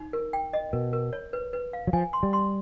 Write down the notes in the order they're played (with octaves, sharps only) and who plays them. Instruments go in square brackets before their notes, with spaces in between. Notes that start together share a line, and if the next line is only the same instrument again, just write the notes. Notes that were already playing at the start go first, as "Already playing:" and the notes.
Already playing: [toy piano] D#4
A#4
G5
D#5
[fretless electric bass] B2 [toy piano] A#4
[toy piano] A#4
C#5
B4
B4
F5
[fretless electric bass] F#3
[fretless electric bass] F3 [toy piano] G#5
[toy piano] C6
[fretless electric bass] G3
[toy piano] C6